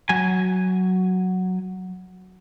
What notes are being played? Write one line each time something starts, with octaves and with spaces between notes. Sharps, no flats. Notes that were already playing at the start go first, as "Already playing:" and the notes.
F#3 G#5